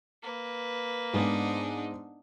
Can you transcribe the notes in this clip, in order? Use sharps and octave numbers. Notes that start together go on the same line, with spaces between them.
A#3 B4
G#2 G#3 B3 D4 D#4